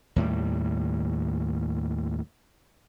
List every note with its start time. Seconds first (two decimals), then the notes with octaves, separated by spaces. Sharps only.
0.16 D#2 A2 G3